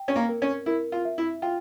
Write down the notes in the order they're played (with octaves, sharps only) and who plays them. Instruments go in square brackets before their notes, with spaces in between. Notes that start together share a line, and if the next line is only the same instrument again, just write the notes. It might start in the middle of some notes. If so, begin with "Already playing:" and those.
Already playing: [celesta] G5
[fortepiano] C#4
A#3
[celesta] A#4
[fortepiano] C#4
[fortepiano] E4 [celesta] A#4
[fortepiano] F4
[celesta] E5
[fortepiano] E4
[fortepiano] F4 [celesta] G5